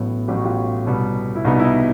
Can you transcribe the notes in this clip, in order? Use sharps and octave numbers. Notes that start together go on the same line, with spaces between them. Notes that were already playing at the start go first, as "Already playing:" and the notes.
Already playing: A1 A2 F#3 B3
A1 A2 F#3 B3 G4
F#4
F4 G4
C2 B2 G3 B3
E4
C2 B2 G3 B3 D#4
E4
D#4